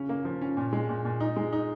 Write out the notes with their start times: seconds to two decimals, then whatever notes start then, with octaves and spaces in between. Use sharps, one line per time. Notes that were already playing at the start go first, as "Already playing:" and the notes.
Already playing: C#3 C#4
0.09 A#3
0.25 F3
0.41 C#4
0.57 A#2
0.73 G#3
0.89 A#2
1.05 A#2
1.20 D#4
1.36 G#3
1.53 D#4